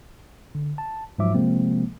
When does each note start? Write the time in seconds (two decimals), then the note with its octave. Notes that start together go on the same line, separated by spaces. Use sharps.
0.55 D3
0.78 A5
1.19 G#2 F3 F#3 E5 D6
1.35 C3 F3 G#3 A#3 C4